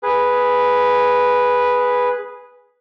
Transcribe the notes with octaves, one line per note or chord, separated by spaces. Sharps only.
G#4 B4